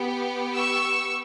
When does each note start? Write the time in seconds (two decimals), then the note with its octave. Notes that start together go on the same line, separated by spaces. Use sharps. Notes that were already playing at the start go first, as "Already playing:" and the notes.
Already playing: B3 G4
0.55 C#6 E6